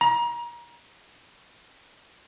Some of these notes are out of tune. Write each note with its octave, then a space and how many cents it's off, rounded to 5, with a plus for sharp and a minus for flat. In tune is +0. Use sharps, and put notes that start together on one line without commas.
A#5 +30